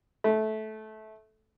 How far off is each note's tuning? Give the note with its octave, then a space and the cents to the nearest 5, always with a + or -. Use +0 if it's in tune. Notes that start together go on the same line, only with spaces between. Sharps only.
A3 -15